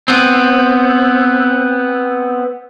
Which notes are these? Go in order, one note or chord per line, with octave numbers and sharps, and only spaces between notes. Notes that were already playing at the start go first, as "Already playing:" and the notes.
B3 C4